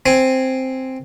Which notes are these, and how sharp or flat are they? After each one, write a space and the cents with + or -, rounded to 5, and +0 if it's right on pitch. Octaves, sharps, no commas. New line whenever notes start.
C4 +0 G#5 +0